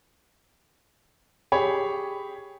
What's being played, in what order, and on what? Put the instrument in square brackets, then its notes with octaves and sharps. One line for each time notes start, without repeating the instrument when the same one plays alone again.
[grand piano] G4 G#4 C#5 B5